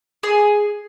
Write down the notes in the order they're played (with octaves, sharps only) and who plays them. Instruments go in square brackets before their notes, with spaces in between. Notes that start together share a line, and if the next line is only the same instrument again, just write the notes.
[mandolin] G#4